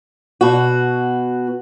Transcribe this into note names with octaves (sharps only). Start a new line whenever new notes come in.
B2 F#4